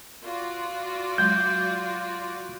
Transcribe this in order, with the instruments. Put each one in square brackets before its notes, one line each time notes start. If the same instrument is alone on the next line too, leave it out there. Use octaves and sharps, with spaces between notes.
[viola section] F4 F#4 D5
[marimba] F#3 G#3 [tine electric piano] G6